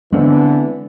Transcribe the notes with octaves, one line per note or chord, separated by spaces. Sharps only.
D3 E3 G#3 B3 C4